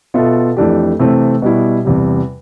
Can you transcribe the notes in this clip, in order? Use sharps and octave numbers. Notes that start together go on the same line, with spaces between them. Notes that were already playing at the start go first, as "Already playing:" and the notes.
B2 B3 F4 A4 E5
F2 E3 A3 D4 G4
C3 E3 A3 C4
B2 G3 B3 E4
E2 C3 G3